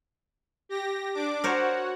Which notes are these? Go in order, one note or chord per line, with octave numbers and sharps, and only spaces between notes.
G4 A#6
D4 D6
F#4 A#4 C5 C#5 F#5